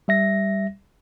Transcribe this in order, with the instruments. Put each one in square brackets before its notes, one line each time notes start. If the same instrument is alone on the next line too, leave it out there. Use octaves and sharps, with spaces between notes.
[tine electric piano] G3 E5 A#6